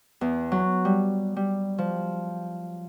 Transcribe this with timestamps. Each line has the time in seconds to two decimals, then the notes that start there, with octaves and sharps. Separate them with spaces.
0.21 E2
0.52 F#3
0.85 G3
1.37 G3
1.78 F3